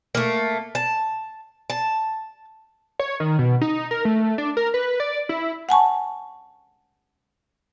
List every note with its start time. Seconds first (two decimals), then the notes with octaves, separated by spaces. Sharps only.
0.15 A3 A#3
0.75 A5
1.70 A5
2.99 C#5
3.20 D#3
3.39 B2
3.61 D#4
3.91 A#4
4.05 A3
4.38 D4
4.57 A#4
4.74 B4
5.00 D5
5.29 E4
5.69 F#5 G#5 A5 C#6